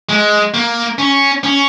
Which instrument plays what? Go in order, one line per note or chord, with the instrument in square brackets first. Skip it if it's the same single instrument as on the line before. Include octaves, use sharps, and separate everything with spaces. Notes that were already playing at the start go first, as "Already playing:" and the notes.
[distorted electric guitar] G#3
A#3
C#4
C#4